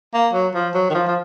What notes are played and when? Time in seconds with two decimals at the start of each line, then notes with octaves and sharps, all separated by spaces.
0.14 A#3
0.33 F#3
0.55 F3
0.74 F#3
0.90 D#3
0.95 F3
1.07 F3